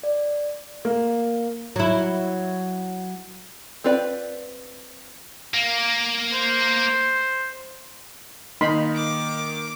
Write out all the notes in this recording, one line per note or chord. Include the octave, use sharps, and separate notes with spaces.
D5
A#3
F#3 E4
C4 F4 B4 D5
A#3
C5
D#3 A#3 D#4 D#5 B5 C6
D6